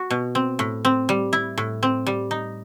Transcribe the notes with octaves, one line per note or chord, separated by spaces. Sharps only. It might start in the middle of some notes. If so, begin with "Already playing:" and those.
Already playing: F#4
B2
C4
A2
C4
G3
E4
A2
C4
G3
D#4